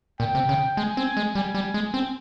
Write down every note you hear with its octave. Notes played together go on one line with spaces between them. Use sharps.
A#2 G5
C3
C#3
G#3 G#5
C4
G#3
G3 G#5
G3
G#3
C4